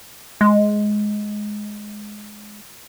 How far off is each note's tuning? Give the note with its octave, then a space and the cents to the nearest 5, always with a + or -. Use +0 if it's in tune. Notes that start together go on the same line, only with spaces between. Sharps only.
G#3 +10